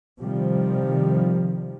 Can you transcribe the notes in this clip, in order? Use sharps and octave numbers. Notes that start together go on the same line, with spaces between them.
C3 D#3 F3 G3